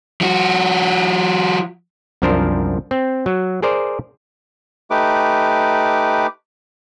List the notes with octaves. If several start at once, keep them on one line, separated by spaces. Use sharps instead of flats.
F3 F#4
C2 F#2 F3 D4 A#4 C5
C4
F#3
G#4 A#4 C5 D5
A3 D#4 G4 B4 D6